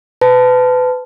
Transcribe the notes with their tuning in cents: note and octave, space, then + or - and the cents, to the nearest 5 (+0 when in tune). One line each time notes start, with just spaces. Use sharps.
B4 +30 A5 +0